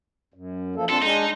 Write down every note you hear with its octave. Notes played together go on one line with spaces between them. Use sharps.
F#2
F3 A#3 A4
C4 D4 F4 A4
G#3 D4 D#4